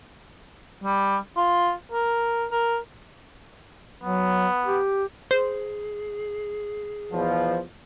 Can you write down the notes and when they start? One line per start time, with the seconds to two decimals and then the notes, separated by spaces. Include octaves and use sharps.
0.84 G3
1.37 F4
1.92 A#4
2.51 A#4
4.03 F#3 B3
4.66 G4
5.31 G#4 C5
7.12 E2 B2 F3